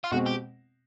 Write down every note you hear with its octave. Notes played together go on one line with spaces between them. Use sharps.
F4
B2 G#3 C4 F#4
G4